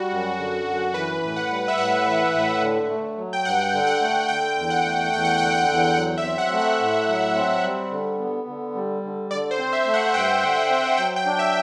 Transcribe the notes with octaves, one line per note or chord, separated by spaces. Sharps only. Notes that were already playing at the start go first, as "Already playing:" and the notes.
Already playing: G3 F#4
F#2
D3
F#2
E3 B4
A2
F#5
G3
E5
A2 F#5
E3
A2
D3
A3
F#3
G5
G2 F#5
D3
F#5
A3
D3 G5
E2
F#5
A3
E2 G5
F#5
G5
D3
G5
E2
F#3 F#5
E5
C4
F#5
A3
F#5
A2
F#3
C4
G3
D3
B3
D3
G3
D3
D3 D5
C5
C4
E5
A3
F#5
G2 G5
D3
C4
F#3 G5
G5
D4
E5